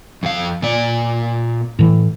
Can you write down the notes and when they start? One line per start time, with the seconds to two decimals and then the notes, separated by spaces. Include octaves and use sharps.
0.23 F2 F5
0.62 A#2 D5
1.79 A2 E3